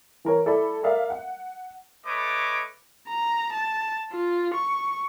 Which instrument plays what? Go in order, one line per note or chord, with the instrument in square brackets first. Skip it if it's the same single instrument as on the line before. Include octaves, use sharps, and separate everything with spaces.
[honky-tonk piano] E3 A#4 C#5
E4 A4 D5 B5
A#4 D5 E5 F5
F#5
[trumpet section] A3 B4 C#5 D#5 D6
[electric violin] A#5
A5
F4
C#6